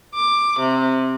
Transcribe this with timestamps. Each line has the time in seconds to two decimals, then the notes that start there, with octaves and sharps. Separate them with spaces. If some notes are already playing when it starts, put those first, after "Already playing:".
0.15 D6
0.59 C3